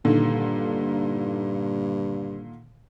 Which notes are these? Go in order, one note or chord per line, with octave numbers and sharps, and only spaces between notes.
G2 A#2 D3 D#3